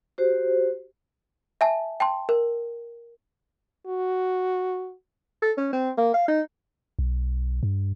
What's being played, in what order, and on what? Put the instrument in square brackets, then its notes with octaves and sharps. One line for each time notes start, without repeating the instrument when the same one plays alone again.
[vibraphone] F#4 G4 C5
[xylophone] E5 G#5 A5
G5 A5 C6
A#4
[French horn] F#4
[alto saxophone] A4
C#4
C4
A#3
F5
D#4
[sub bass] B1
G2